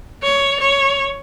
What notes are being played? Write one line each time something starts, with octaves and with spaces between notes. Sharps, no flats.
C#5
C#5